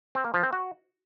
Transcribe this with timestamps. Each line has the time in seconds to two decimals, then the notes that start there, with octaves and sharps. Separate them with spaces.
0.15 C4
0.24 A#3
0.34 F3
0.43 C4
0.53 F#4